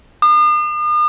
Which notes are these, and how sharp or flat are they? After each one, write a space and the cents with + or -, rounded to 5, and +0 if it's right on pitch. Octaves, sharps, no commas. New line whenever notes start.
D#6 -45